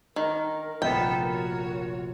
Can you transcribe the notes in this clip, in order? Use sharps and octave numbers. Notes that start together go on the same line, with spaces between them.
D#3 D4 A#4
F1 A#1 B3 A4 A#4 G5
F#4 C#5